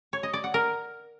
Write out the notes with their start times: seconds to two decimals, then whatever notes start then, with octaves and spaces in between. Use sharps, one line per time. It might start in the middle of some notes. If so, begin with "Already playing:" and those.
0.13 C#5
0.23 D#5
0.34 D5
0.44 F#5
0.54 A#4